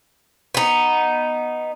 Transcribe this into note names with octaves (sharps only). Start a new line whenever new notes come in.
B3 D#4